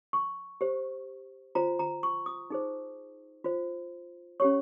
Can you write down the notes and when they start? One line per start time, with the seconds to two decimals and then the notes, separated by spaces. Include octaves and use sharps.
0.13 C#6
0.61 G4 C5
1.55 F4 C5 A#5
1.79 A#5
2.03 C#6
2.26 D#6
2.50 D#4 G#4 C5
3.44 F4 C5
4.40 C#4 G4 C#5 C#6